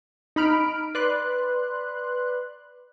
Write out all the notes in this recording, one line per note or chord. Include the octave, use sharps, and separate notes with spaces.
D#4 B5 F6 D7
B4 D5 C6 F#6